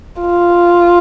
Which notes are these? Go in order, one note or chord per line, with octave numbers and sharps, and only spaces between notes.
F4